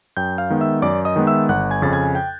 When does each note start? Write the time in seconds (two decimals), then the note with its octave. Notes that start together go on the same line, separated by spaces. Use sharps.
0.17 F#2 G5 G6
0.38 F5 F6
0.50 D#3 G#3 B3
0.61 E5 E6
0.82 F#2 D5 D6
1.05 D#5 D#6
1.16 D#3 G#3 B3
1.27 E5 E6
1.49 G1 F#5 F#6
1.71 G#5 G#6
1.82 F2 C#3 A6
1.93 G#5 G#6
2.15 G5 G6